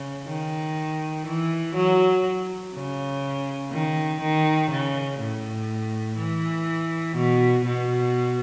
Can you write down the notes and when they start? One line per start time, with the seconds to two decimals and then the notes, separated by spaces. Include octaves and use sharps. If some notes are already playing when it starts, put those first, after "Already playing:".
Already playing: C#3
0.27 D#3
1.27 E3
1.75 F#3
2.74 C#3
3.72 D#3
4.21 D#3
4.70 C#3
5.19 A2
6.18 E3
7.16 B2
7.65 B2